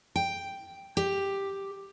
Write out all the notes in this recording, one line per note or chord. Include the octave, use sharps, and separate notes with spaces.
G5
G4